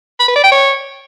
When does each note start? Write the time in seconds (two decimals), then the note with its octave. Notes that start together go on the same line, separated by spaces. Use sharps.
0.20 B5
0.28 B4
0.36 D5
0.44 G5
0.51 C#5